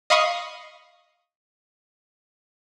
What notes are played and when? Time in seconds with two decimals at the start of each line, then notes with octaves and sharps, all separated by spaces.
0.10 D#5 F5 B5 C#6 D#6